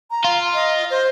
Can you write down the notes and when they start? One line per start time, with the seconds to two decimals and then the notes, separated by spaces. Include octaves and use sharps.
0.11 A#5
0.25 F4
0.54 D#5
0.90 C5